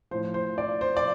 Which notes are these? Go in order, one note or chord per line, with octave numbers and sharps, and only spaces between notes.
A2 F3 C5
C5
D5
C5
D5